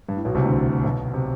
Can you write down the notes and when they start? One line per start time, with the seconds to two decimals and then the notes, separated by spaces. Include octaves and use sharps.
0.09 G2
0.16 A2
0.25 B1 B2
0.35 C2 C3
0.44 D2 D3
0.84 B1 B2
1.14 C3